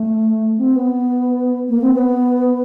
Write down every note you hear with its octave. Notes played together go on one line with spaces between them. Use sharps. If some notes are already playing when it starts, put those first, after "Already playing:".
Already playing: A3
C4
B3
A#3
C4
B3